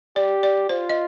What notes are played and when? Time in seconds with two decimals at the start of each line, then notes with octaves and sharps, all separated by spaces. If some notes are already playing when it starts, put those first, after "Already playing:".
0.16 G4 D5
0.43 D5
0.69 F4 C5
0.89 D#5